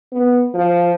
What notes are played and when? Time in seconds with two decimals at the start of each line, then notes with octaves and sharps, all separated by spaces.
0.12 B3
0.55 F3